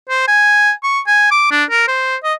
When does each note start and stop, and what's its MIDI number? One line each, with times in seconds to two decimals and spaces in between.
0.09 0.27 72
0.28 0.72 80
0.83 1.00 85
1.07 1.28 80
1.31 1.49 86
1.51 1.64 62
1.70 1.87 70
1.88 2.16 72
2.24 2.34 75